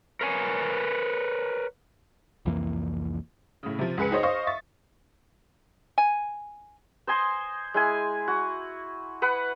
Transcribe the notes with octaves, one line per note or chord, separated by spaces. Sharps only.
A#4 B4 C#5 G#5
C2 F2 E3 A#3
A2 C#3
C3 F3
C#2 G#3 B4 G#5 C#7
D#4 G#4 C5 C#5 D#5
C5 D#5 F5 C#6 D#6
E5 C#6 A6
G#5
C5 D#5 G#5 C6
G#3 E4 G#5
F#4
B4 F#5 B5